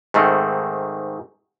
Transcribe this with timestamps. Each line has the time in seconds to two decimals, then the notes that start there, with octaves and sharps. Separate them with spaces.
0.14 G#2 D#3 A3 C4